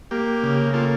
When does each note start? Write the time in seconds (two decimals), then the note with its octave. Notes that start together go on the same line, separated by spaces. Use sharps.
0.11 A#3 G4
0.43 C#3
0.73 A#3 F4 A4